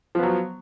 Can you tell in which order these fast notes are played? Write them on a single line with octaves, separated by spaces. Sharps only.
F3 B3 F#3